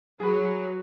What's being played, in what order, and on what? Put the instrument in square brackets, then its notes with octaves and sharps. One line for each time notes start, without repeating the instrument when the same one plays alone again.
[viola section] F#3 [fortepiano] G#4 B4